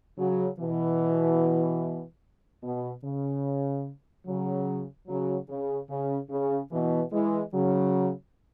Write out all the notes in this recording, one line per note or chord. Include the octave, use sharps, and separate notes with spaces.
C#3 F#3
B2 E3
B2
C#3
C#3 F#3
C#3 F#3
C#3
C#3
C#3
B2 E3
E3 G#3
C#3 F#3